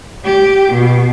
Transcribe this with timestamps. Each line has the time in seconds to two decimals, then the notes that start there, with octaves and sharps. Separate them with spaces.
0.25 G4
0.73 B2